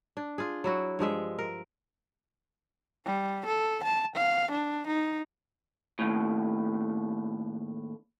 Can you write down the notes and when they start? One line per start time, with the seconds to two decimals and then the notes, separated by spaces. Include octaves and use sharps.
0.17 D4
0.38 F4 G#4
0.64 F#3 E4 F#4
0.99 G2 F3 G#3 E5
1.39 A#4
3.05 G3
3.46 A4
3.83 A5
4.16 F5
4.51 D4
4.87 D#4
5.99 D#2 A2